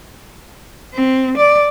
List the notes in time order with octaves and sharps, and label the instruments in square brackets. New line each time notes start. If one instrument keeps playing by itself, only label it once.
[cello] C4
D5